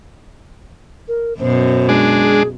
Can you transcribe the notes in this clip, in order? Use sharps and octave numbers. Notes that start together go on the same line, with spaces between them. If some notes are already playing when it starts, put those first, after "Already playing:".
A#4
F#2 B2 C5
G#3 D4
G#4